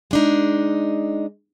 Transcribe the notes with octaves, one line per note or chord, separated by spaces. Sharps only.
G#3 D4 D#4